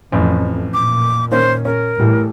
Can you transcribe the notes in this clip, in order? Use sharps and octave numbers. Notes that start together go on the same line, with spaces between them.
A1 F2 A2
A#2 D6
D#3 A#3 C#4 C5
C#4 A#4
A2 E3 G3